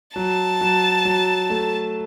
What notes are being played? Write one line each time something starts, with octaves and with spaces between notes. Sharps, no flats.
F#3 A5
F#3
F#3
A3